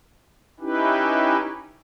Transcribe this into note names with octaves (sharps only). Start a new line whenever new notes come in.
C#4 D#4 E4 G4 B4